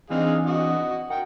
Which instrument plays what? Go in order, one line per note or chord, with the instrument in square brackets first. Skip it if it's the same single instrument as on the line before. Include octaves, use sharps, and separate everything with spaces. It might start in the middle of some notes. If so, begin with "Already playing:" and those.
[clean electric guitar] E3 C4 D4 [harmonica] D#4 G#4 F5
[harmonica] F#4 D#5
[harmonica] A#4 G5 [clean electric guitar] F#5